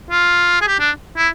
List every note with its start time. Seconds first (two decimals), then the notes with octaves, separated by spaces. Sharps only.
0.11 F4
0.61 G#4
0.68 G4
0.79 D4
1.17 E4